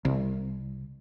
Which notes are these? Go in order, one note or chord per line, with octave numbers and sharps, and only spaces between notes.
C2